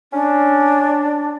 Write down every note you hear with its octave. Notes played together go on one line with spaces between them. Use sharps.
C#4 D4